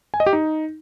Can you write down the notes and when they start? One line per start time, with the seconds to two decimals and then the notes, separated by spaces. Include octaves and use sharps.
0.14 G#5
0.20 D#5
0.26 G4
0.33 D#4